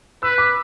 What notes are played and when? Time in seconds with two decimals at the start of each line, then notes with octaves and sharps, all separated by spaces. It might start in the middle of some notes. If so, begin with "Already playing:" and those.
0.23 B4 E6
0.38 D6